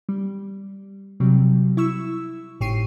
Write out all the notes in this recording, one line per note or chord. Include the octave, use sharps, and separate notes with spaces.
G3
C3 F#3 G3
E4 C#6 E6
G#1 A2 G4 C#6 C7 D#7